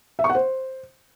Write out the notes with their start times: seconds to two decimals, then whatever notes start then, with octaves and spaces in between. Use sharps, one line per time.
0.19 E5
0.24 C#6
0.29 F#5
0.35 C5